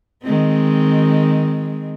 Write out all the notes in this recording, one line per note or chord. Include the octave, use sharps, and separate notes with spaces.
D#3 G#3 C4